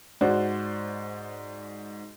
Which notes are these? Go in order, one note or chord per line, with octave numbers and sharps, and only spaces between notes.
G#2 F#4 C5 D5